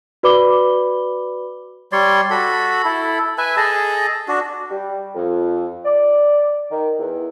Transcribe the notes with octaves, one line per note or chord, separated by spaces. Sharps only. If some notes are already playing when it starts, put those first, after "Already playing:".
F#4 B4 D5 B5 D6 G7
G3 C#5 D5 C6
F#4 A4 B5
E4 A4
B4 E5 G#5
G#4 A4 D#5 A5
D4 F#4
G3
F2
D5
D#3
E2